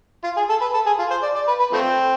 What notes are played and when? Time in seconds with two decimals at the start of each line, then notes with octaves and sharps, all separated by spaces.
0.24 F4
0.36 G#4
0.49 A4
0.61 B4
0.74 A4
0.86 G#4
0.99 F4
1.10 C5
1.23 D5
1.35 D5
1.48 B4
1.60 B4
1.73 F3 A3 C4